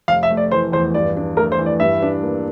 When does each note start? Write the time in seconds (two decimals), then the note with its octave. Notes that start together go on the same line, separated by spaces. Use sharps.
0.08 F1 F5
0.23 E5
0.31 A3
0.37 D5
0.51 E3 C5
0.72 E2 C5
0.94 G2 D5
1.17 D4
1.37 A3 A#4
1.52 C5
1.58 E3
1.66 D5
1.80 G2 E5
2.02 D4
2.23 A#3